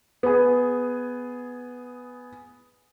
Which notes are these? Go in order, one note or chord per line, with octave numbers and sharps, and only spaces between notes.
B3 G#4